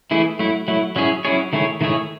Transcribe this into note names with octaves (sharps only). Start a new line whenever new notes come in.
E3 A3 E4 G#4
F#3 A3 E4
F#3 A3 E4
F#3 C#4 E4 G#4 C#5
F#3 C#4 E4 G#4 C#5
D#3 A3 E4 G#4 C#5
D#3 A3 E4 G#4 C#5